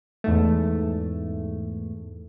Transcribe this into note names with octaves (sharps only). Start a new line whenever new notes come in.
E2 G#2 A3